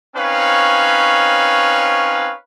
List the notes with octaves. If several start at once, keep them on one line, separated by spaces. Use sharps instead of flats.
C4 C#4 D#4 B4 C#5 F5